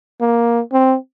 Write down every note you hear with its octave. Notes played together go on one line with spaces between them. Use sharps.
A#3
C4